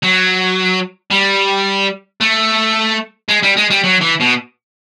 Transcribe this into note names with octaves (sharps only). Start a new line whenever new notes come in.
F#3
G3
A3
G#3
G3
G#3
G3
F#3
E3
B2